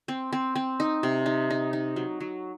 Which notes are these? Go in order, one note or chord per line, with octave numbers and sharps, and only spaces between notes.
C4
C4
C4
D#4
C3
D#4
D#4
D#4
F#3
F#3